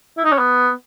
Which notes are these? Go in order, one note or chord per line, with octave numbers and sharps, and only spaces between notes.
E4
D#4
C#4
B3